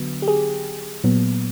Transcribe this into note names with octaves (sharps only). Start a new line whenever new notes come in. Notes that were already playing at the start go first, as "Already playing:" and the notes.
Already playing: D3 F#3 B3
G4
G#4
A#2 F#3 B3